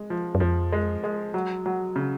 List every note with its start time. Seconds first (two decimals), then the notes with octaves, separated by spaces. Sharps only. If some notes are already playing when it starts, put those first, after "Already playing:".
Already playing: G#3
0.10 F3
0.35 F#2
0.40 F2 F3
0.72 G#3
1.04 G#3
1.34 F#3
1.66 F#3
1.96 C#3